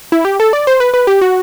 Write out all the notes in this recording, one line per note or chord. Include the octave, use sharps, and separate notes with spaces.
E4
G4
A4
D5
C5
B4
B4
G4
F#4